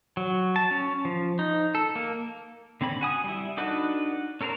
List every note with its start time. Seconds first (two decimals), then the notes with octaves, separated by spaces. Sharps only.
0.17 F#3
0.56 A5
0.71 C#4
1.05 F3
1.39 D#4
1.75 A4
1.96 A#3
2.81 D3 C4 C#4 B5
3.01 F#4 G#5 D#6
3.24 G3 E4
3.57 D4 D#4 F#4 A4 B4
4.41 C#4 A4 A#4 C5 A#5